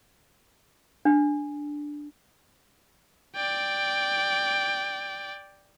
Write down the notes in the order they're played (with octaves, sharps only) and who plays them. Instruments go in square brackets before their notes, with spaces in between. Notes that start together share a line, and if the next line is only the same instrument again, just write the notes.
[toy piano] D4
[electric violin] D5 G5